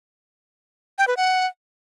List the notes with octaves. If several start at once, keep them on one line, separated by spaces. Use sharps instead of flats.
G5
B4
F#5